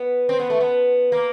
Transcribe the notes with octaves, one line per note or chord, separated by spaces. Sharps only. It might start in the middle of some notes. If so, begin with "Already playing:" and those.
Already playing: B3
C4
B3
A3
B3
A#3